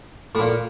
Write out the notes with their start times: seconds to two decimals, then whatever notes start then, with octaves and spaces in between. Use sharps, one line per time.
0.35 A2
0.39 A#2